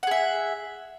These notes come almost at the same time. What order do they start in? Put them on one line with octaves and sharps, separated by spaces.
F#5 G#4 E5